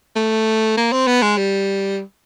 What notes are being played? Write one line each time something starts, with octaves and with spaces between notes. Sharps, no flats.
A3
A#3
C4
B3
G#3
G3